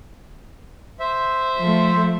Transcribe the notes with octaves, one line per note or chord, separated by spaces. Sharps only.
C5 E5
F3 A3